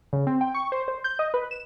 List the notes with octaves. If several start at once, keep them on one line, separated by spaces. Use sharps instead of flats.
C#3
C4
G5
C#6
C5
C5
G6
D#5
B4
E7